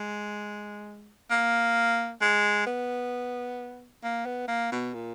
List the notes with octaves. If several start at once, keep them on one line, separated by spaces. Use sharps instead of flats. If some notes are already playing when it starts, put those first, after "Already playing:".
Already playing: G#3
A#3
G#3
B3
A#3
B3
A#3
B2
A#2